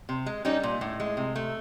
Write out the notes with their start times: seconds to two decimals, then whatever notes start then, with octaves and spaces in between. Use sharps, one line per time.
0.09 C3
0.26 G#3
0.45 G3 C#4 D#4
0.63 A#2
0.81 A2
1.00 G#3
1.17 C3
1.36 A3